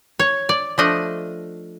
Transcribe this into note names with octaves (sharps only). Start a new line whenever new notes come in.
C#5
D5
F3 A3 D4 D#5